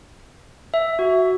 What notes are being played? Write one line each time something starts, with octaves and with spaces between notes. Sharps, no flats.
E5
F#4